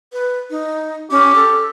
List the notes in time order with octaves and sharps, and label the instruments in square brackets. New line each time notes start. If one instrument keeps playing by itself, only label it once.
[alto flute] B4
D#4
[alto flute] C#4 [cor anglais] G4
[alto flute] A4